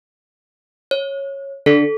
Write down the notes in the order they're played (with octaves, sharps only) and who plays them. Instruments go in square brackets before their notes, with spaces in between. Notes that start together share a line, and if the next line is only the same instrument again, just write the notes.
[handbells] C#5
[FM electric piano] D3 [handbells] A4